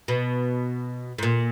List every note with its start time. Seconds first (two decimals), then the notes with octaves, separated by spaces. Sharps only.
0.08 B2
1.18 G#2
1.23 A#2